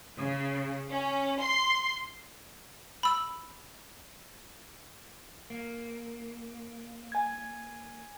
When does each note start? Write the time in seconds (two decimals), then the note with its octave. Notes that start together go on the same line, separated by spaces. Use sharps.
0.17 C#3
0.89 C#4
1.40 C6
3.03 B5 E6
5.50 A#3
7.12 G#5 G#6